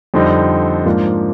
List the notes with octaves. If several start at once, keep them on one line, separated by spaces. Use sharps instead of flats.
F2 D3 G3 C4 D#4
G#2 F3 A#3 D4